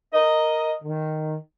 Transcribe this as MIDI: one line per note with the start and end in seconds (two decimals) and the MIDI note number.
0.12 0.73 70
0.12 0.73 75
0.83 1.35 51